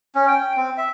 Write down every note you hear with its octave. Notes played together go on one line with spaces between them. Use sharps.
C#4
G5
C4
E5